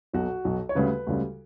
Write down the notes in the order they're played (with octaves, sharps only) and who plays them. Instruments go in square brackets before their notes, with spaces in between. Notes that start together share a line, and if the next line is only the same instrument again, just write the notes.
[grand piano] B1 B2 F#3 F#4
B1 B2 F#3
C#5
D2 C#3 G3 B4
D2 C#3 G3